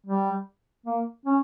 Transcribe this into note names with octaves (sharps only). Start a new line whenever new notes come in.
G3
A#3
C#4